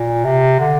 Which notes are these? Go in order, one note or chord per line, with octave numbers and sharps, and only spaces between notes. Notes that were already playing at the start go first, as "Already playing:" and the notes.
Already playing: A#2
C3
D3